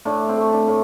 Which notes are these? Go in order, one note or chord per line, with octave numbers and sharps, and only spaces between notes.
A2 D4
C4
A3
D4
A2